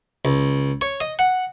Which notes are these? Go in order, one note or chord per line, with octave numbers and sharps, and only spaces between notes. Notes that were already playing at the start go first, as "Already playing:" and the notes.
C#2
C#5
D#5
F#5